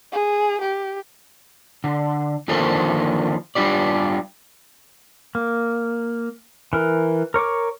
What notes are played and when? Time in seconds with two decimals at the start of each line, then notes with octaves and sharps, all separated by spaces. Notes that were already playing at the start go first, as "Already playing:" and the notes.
0.12 G#4
0.61 G4
1.84 D3
2.48 D3 D#3 F3 A#3 A4 C5
3.55 G3 D4 F4 G4 D5
5.35 A#3
6.73 E3 A#4
7.34 A#4 C#5 C#6 D6